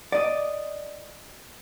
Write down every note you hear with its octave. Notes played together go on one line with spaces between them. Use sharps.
D5 D#5